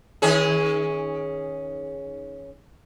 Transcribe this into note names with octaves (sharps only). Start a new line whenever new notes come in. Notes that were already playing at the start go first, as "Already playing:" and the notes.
D#3 C#4 G#4